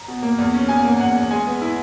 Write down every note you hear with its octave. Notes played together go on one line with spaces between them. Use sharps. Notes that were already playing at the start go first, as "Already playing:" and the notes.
Already playing: A#5
B2
A#3
E2
C#4
B2 G#5
A#3
E2 F#5
E2
G#3 G#5
B3
E4